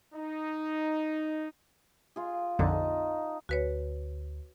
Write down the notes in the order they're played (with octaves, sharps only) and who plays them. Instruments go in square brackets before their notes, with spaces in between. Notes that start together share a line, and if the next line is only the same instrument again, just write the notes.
[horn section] D#4
[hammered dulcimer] F4 G#4
[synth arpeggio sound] A#1 F2 D3 [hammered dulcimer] D#4 A5
[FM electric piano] D2 [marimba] F#4 B4 C#5